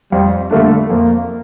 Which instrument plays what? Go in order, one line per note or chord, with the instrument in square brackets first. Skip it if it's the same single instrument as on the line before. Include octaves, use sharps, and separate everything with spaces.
[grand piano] F2 [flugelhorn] G3
[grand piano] D3 G3 A#3 D4 [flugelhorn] A3
[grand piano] F2 [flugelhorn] A#3